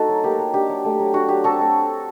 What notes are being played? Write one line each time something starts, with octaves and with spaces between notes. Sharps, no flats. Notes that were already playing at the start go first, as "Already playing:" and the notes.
Already playing: A3 D#4 F#4 A4
F#3
A#3 G4
F#3
D4 G4
F#3
A3
F#3
D4 F#4
F#3 G4
C4 F#4 A4
A3